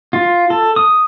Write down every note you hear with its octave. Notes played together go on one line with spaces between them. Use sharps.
F4
A4
D#6